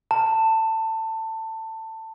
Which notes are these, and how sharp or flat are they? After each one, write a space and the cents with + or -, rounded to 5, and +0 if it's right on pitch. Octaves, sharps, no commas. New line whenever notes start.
A5 +20